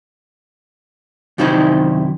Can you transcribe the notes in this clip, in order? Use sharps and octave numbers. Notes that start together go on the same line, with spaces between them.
F#2 C3 D#3 D#4 E4 C5